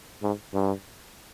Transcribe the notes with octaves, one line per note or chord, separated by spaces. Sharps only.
G#2
G2